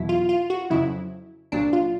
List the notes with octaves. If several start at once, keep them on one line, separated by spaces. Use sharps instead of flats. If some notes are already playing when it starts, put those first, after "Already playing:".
Already playing: E2 B2 F#3 E4
F4
F4
F#4
F2 C#3 F#3 E4
C2 A#2 F#3 D4
F4